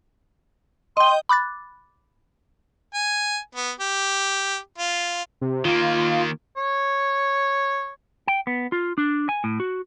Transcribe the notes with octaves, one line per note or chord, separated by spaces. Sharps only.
D#5 G5 C6
B5 D6 F#6 A6
G#5
B3
G4
F4
C3
D#3 A#3 F4
C#5
G5
B3
F4
D4
G#5
A2
F#4